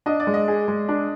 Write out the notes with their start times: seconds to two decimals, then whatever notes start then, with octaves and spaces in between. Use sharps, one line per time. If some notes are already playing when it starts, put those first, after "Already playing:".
0.06 D4 D#5
0.20 D5
0.27 G#3
0.34 D#5
0.48 G#4
0.68 G#3
0.89 D4